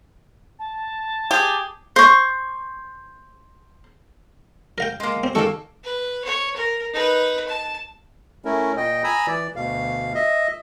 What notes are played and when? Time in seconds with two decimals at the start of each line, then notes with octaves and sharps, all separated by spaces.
0.59 A5
1.31 G4 G#4
1.96 C5 C#6
4.78 A#4 F5 G5
5.00 G#3 A#3
5.24 C4
5.35 D#3 G#3 A#3 A4 C#6
5.83 B4
6.25 C#5
6.56 A#4
6.93 D#4 B4
7.48 A5
8.45 A3 C#4 E4 A#4
8.77 A#2 D#5 G5
9.04 G#5 A#5 B5 D#6 E6
9.27 E3 D5
9.56 D2 B2 F5
10.15 D#5 E5